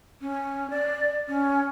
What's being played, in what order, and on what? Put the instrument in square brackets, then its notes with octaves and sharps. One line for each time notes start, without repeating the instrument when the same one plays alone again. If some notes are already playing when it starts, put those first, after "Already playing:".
[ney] C#4
D5
C#4